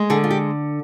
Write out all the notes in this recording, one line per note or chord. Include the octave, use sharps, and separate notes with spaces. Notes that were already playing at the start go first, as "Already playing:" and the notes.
Already playing: G#3
D3 G#4
F4
G4